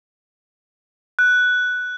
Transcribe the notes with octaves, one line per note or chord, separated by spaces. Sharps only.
F#6